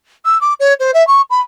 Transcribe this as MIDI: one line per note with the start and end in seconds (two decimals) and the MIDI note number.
0.25 0.40 88
0.41 0.54 86
0.60 0.74 73
0.80 0.91 72
0.94 1.06 76
1.07 1.22 85
1.30 1.41 83